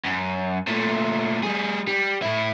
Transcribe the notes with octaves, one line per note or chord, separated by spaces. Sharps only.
F#2
A#2 A3
G3 G#4
G3
A2 E4